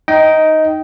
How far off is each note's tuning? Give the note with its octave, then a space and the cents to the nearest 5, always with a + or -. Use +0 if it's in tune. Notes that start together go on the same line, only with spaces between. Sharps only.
D#4 +0 D#5 +15 G5 -15